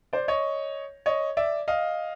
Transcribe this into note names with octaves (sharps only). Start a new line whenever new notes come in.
C5 D5
C#5 D#5
C#5 D#5
D5 E5
D#5 F5